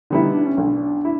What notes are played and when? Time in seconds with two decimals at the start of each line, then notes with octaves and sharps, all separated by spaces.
0.10 D3 G3 B3 D#4 E4
0.34 D4
0.46 C#4
0.57 B1 D4
1.05 E4